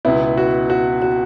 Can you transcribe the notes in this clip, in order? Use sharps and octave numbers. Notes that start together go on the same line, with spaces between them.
C#2 B2 B3 E4
F#4
F#4
F#4